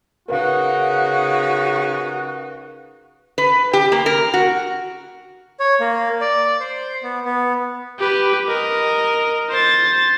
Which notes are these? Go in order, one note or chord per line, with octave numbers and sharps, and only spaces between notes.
C#3 D#4 F#4 A#4 B4 F5
B4
G4
A#3
A#4
F#4
C#5
A#3
D5
C5
B3
B3
G4 B4
A#4 D#5
C5 A6